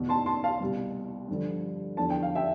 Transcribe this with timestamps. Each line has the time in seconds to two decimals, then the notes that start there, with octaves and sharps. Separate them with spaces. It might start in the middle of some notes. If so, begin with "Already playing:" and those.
Already playing: E2 B2
0.09 A5 C6
0.26 A5 C6
0.44 F5 A5
0.61 C2 B2
1.28 G2 D3 F3
1.97 E2 D3 F3 A5
2.10 G5
2.23 F5
2.35 E5 G5